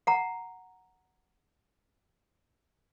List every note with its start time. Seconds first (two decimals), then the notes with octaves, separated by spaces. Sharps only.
0.07 F#5 A#5